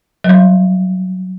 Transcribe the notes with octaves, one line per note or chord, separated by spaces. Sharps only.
F#3
G3